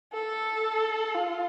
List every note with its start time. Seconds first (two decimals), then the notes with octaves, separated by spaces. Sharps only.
0.13 A4
1.14 F4